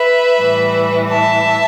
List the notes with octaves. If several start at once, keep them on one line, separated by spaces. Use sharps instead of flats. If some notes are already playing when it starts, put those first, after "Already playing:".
Already playing: B4 E5
A2 E3 G3
E5 A5